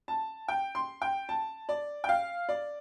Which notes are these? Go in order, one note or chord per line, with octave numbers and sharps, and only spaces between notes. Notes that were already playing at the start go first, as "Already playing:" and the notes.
A5
G5
C6
G5
A5
D5
G5
F5
D5